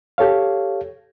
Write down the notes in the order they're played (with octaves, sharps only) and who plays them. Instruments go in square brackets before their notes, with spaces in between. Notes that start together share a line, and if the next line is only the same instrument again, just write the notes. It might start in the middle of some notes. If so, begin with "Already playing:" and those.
[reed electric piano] G4 A4 C#5 F5